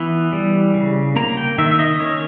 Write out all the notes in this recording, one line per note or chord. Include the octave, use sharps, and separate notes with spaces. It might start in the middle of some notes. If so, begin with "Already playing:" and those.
Already playing: E3 B3
G3
C#3
A#3 A#5
G5
D#3 E5
E5
D#5
C#4 C#5